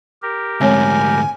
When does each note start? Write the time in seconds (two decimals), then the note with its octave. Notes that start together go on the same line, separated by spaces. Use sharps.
0.22 G4 A#4
0.61 D2 G#2 G#3 C4 C#5 G#5